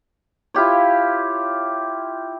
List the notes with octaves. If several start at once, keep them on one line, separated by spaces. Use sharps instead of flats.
E4 F4 G4 C#5